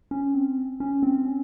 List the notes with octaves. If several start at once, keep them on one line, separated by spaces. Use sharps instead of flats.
C#4
C4
C#4
C4
C#4